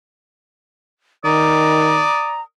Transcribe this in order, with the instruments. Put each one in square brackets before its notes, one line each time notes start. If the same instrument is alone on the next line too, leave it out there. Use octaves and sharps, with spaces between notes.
[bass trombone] D#3 [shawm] D5 [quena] A#5 [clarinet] D#6